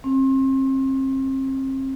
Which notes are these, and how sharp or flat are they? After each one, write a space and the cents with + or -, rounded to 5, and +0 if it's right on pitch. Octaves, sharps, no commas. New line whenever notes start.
C4 +35